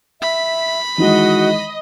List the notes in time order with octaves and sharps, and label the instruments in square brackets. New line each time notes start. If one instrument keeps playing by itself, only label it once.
[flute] E5 [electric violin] B5
[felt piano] D#3 E3 G#3 [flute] F#4 [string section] D#5